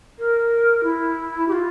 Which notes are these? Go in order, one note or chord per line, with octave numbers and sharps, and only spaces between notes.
A#4
E4
G4
F4